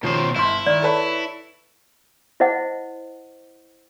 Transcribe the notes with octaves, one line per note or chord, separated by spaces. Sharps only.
B2 D#3 F3 C#4 C5
G1 E4 D#5 C6
D#3 D5
A4 B4 C#5
E4 C5 D#5 F#5